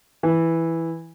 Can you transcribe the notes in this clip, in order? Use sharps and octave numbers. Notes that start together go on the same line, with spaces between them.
E3